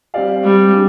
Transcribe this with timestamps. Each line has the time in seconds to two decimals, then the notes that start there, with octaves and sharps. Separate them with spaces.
0.14 G3 C4 G4 D5 F5
0.44 G3
0.72 G#3 D4 G4